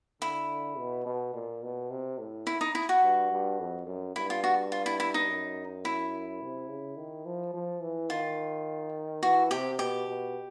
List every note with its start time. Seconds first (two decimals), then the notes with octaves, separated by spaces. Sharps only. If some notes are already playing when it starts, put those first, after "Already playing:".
0.21 D3 E4
0.78 B2
1.06 B2
1.34 A#2
1.63 B2
1.90 C3
2.18 A2
2.47 E4
2.61 D#4
2.75 E4
2.89 F#4
3.03 G2
3.32 G2
3.60 F2
3.87 F#2
4.16 G2 E4
4.30 F4
4.44 F#4
4.72 F4
4.86 E4
5.00 E4
5.14 D#4
5.28 F#2
5.85 E4
6.41 C3
6.69 C#3
6.97 D#3
7.26 F3
7.54 F3
7.81 E3
8.10 D#3 F4
9.23 E3 F#4
9.51 C3 G4
9.78 B2 G4
10.07 B2